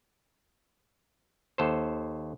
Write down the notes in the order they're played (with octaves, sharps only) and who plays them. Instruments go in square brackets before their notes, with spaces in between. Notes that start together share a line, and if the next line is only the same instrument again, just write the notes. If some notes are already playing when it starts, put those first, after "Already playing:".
[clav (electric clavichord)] D#2 A4 C5